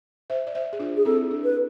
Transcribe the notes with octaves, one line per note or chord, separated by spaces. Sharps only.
C5 E5
D5
C5 E5
G#4
D4 F4
G#4
C4 E4 A4
D4
B4